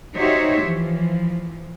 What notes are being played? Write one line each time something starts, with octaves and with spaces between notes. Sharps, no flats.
D#4 F#4 G4 C5 C#5 E5
E3 F3